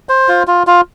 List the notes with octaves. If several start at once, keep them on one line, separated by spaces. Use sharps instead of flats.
C5
F4
F4
F4